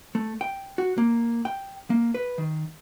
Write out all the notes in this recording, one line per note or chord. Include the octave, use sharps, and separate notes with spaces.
A3
G5
F#4
A#3
G5
A#3
B4
D#3